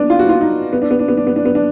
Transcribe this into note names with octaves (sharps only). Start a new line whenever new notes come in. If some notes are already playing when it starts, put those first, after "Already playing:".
Already playing: B3 D4
F4
F#4
F4
D#4
B3
D4
B3
D4
B3
D4
B3
D4
B3
D4